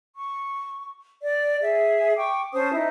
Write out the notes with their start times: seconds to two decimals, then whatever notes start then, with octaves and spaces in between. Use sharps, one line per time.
0.15 C#6
1.23 D5
1.61 G#4 E5
2.17 G5 C#6 D6
2.54 C#4 C5 A5 D#6
2.74 D#4 E4